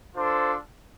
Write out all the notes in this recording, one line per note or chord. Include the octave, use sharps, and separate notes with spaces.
D4 F4 A4 C5